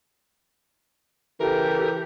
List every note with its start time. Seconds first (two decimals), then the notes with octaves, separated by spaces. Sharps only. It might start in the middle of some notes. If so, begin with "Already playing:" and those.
1.40 C#3 E3 G4 A4 A#4